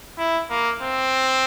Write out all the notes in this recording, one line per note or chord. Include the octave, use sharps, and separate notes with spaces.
E4
A#3
C4